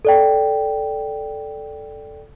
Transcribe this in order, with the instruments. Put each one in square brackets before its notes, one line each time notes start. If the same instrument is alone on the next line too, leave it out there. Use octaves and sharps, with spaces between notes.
[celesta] A4 D5 G5